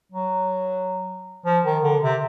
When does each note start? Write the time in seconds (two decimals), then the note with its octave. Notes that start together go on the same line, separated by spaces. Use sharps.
0.12 F#3
1.45 F3
1.64 D#3
1.83 D3
2.02 C3